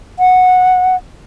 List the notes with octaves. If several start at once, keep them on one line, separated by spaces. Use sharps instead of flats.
F#5